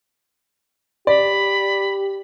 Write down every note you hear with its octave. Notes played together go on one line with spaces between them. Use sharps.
G4 D5 B5